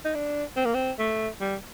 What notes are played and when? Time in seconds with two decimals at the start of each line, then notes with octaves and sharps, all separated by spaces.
0.05 D#4
0.15 D4
0.56 C4
0.65 A#3
0.74 C4
0.99 A3
1.41 G3